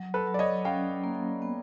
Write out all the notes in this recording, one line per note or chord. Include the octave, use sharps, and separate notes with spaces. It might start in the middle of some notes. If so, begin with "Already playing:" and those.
Already playing: F#3
A4 B4
F#3
D5
C#5 D#5
C#4 F5 G5
A#3
B3